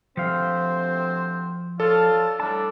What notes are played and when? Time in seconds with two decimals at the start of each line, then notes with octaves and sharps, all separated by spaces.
0.17 D2 C3 F3 C4 C5 F5
1.80 F4 A4 C#5 D5 A5
2.40 A2 D3 G3 D4 A5